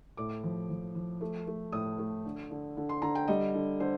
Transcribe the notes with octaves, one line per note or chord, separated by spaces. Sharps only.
A2 D6
F3
F3
F3
A3
A3
A2 D#6
A3
D3
D3
D3
C6
D3 A#5
G5
G3 D#5
D3
D3 C5